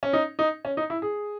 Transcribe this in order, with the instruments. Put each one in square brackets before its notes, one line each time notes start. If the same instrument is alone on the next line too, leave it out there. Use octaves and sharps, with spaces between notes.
[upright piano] C#4
D#4
D#4
C#4
D#4
E4
G#4